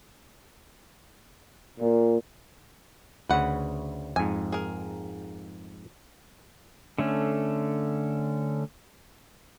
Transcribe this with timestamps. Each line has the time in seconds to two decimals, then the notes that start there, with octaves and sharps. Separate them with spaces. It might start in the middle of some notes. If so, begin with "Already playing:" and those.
1.79 A#2
3.29 D2 C#3 B4 F#5
4.16 F2 G#2 G#5
4.52 G#4 A#4
6.98 D3 A3 C#4